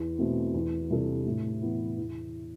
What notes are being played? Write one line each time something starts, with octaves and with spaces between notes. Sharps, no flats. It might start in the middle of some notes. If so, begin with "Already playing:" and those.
Already playing: E2
B2 A3 C4
E2
C3 G3 D4 A4
A2
E3 B3 E4
E2